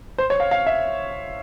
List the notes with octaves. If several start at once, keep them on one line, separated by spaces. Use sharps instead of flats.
C5
C#5
F5
F5
E5